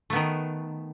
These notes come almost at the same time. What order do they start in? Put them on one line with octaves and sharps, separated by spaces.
A3 B3 D#3